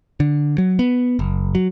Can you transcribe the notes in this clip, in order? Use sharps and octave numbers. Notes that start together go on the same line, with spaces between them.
D3
F#3
B3
F#1
F#3